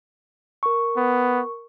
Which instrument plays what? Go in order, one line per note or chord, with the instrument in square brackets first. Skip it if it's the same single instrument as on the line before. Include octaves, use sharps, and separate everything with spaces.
[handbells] A#4 C#6
[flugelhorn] B3